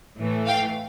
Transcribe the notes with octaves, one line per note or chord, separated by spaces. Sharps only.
A2 E3 A3
F5 G5